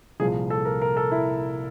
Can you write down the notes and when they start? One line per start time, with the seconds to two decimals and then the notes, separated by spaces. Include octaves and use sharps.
0.20 C2 A#2 F3 G#4
0.50 A4
0.65 A#4
0.82 A#4
0.97 A4
1.11 E4